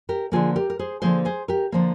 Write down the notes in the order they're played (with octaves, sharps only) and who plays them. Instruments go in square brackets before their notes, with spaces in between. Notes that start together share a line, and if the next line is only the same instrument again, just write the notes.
[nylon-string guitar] G4 A#4
D3 F3 A#3 F4 G#4
G4 A#4
A#4
G#4 C5
D3 F3 A#3 G#4 C5
G#4 C5
G4 A#4
D3 F3 A#3